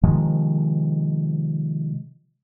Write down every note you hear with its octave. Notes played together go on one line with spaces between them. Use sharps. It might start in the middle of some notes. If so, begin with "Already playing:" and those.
C3 D#3 F3 G#3